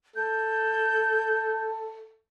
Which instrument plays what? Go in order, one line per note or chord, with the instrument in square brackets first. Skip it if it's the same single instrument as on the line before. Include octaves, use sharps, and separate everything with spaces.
[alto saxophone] A4 [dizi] G6